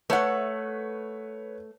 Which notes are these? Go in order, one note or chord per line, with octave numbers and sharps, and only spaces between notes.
A3 B4 C#5 F#5